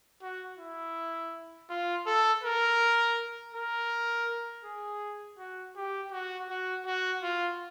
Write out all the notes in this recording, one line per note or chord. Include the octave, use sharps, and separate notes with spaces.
F#4
E4
F4
A4
A#4
A#4
G#4
F#4
G4
F#4
F#4
F#4
F4